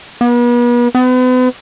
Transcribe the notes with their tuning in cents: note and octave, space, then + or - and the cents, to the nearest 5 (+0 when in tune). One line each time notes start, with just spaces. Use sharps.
B3 -40
B3 +40